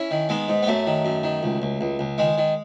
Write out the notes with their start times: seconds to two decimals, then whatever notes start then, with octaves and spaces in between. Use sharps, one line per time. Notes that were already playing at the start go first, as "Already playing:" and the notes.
Already playing: C#4 E4
0.11 D#3
0.29 D#3 G#3 B3
0.48 G#2
0.63 B3
0.67 F#2 F#3 A3
0.87 D#3
1.05 F#2
1.23 D#3
1.43 C#2
1.62 C#2
1.81 C#2
1.99 C#2
2.18 D#3 G#3
2.38 D#3